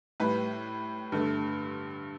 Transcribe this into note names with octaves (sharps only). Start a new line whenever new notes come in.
A2 G3 B4
G2 D3 A3